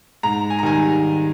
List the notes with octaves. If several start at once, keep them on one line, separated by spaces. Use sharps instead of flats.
G#2 A#5
G#5
A#5
D#3 G3 G#5